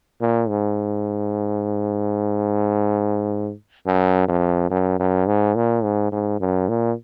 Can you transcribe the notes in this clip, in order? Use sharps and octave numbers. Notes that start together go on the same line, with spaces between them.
A#2
G#2
F#2
F2
F#2
F#2
G#2
A#2
G#2
G#2
F#2
A#2